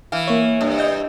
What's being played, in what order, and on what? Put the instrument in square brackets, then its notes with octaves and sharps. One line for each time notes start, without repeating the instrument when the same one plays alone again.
[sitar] E3 [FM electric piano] F5
[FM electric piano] A#3 C#5
[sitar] G2
[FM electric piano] D#5 G6